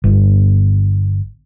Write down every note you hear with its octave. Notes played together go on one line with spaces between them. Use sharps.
G1